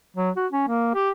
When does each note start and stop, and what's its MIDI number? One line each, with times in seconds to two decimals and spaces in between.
0.17 0.30 54
0.36 0.47 66
0.53 0.63 61
0.68 0.90 58
0.95 1.10 67